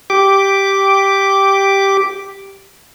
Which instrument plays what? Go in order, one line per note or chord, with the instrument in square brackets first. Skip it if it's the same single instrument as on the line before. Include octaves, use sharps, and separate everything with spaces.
[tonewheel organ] G4 D6